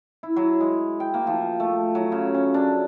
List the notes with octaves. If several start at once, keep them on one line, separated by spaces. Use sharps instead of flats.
E4
F#3
G#3
G5
A#3
F3
A3
F#3
C#3
C#4
D4